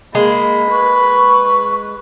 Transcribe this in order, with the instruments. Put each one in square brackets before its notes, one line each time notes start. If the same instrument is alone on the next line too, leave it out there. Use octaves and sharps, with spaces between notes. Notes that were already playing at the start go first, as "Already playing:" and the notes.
[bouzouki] G#3 [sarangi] A#3 [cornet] B5
[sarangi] B4 [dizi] C#6